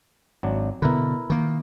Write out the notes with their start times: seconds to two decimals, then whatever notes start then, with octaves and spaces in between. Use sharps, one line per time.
0.43 G#1 F#3 D4
0.82 B2 D3 E4 A#4 B4
1.30 D#3 A#3